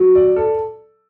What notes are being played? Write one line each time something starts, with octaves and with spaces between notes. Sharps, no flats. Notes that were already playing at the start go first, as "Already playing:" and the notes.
Already playing: F#3
D5
A4